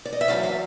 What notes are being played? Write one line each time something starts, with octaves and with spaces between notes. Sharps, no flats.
D5
D#5
E5
E2 B2 F#3 F5
F5